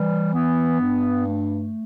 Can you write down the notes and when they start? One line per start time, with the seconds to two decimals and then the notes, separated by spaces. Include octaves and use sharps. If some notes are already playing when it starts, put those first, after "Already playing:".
Already playing: E3 G3
0.34 B3
0.80 G2
1.27 A3